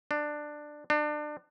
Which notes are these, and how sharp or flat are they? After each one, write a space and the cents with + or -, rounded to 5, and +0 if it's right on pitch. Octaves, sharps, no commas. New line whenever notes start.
D4 +15
D4 +30